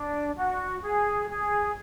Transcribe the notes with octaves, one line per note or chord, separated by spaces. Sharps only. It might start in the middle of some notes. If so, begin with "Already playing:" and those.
Already playing: D4
F#4
G#4
G#4